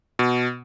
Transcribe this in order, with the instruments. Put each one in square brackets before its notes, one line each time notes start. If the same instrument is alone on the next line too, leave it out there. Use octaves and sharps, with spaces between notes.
[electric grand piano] B2